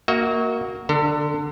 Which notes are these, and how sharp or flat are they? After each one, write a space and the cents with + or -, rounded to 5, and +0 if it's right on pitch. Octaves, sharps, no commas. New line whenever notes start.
A#3 +0 F#4 +0 E5 -45
D3 +10 A4 +45